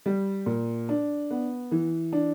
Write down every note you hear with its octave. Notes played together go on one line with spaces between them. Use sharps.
G3
A#2
D4
B3
E3
D4